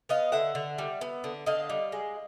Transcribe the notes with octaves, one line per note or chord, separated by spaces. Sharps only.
B3 D#5 F5
D3 E5 F#5
D3
G3
B3
D3
D3 D#5 F5
G3
G#3